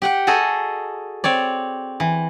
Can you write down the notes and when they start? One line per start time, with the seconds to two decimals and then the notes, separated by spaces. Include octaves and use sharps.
0.02 G4 F#5 G5
0.27 F#4 G#4 A4 D#5
1.24 C4 C#5 D5
2.00 E3